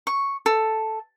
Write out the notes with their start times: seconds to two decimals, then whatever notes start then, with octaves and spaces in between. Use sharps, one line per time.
0.07 C#6
0.46 A4